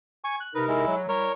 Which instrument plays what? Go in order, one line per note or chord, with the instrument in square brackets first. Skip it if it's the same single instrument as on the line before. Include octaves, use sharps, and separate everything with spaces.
[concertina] G#5 C#6
F#6
[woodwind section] C3 D#4 A#4 [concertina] B4
[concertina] G#3 E4
[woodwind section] F#3
[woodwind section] G3 E4 [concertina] A#4 C#5